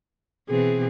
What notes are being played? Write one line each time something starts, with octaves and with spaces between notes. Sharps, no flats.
B2 E3 C4 G#4